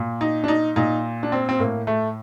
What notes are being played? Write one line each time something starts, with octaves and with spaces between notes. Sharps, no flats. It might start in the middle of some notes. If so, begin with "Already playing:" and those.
Already playing: A#2
D#4
D4
D#4
A#2 D#4
D4
C4
C4
A2 A#3
A3